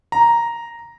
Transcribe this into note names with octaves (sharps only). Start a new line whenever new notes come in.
A#5